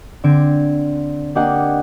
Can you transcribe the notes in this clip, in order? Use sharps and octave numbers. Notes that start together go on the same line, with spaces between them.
D3 C4 G#6 D7
A#3 D4 G4 D#5 F#5 G#5